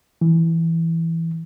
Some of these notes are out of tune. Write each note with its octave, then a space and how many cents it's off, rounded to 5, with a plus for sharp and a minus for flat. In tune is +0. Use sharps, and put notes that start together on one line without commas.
E3 +0